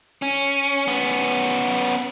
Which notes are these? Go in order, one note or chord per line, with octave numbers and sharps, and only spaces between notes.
C#4
B3 C#4